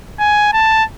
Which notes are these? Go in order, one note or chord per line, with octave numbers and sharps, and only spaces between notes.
G#5
A5